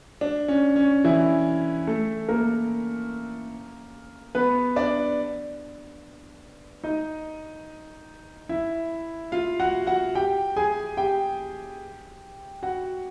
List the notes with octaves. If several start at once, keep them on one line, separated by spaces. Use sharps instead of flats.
D4
C#4
C#4
E3 E4
A3 A4
A#3 A#4
B3 B4
D4 D5
D#4 D#5
E4 E5
F4 F5
F#4 F#5
F#4 F#5
G4 G5
G#4 G#5
G4 G5
F#4 F#5